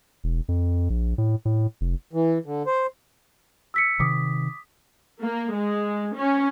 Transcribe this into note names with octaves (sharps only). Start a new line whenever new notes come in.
E1
F2
A#1
A2
A2
F1
E3
D3
C5
E6 B6 C#7
C3 D#3 D6 D#6 B6
A#3
G#3
C#4